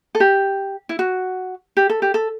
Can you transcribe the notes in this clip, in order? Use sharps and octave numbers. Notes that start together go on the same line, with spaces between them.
A4
G4
E4
F#4
G4
A4
G4
A4